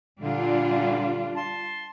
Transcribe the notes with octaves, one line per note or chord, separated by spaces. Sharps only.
A#2 D3 G3 D4 F4
A5 C6